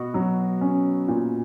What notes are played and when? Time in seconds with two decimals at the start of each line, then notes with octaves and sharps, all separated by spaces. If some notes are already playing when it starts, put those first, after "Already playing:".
Already playing: B2 F#4
0.14 F#3
0.61 C#4
1.08 A#2